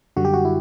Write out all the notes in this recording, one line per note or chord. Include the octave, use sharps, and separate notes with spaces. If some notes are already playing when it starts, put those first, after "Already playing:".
F#2 D3 G3 F#4
G4
F#4
E4